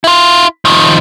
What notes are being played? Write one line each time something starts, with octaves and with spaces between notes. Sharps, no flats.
E4 F4
D#3 F3